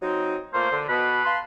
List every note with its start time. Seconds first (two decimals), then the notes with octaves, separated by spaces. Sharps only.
0.01 F#3 C4 D#4
0.53 A#2 A3 A#3 C5
0.71 D3
0.88 B2 B4
1.24 F5 A5 C6